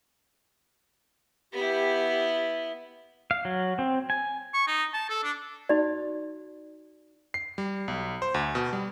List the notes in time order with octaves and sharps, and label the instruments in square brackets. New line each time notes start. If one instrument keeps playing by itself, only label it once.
[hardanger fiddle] B3 E4 [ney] G4
[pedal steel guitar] F5
F#3
C4
G#5
[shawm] C#6
D#4
A5
A4
D4
[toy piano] D#4 F#4 D5
[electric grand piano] C7
G3
B1
C5
D2
B2
G3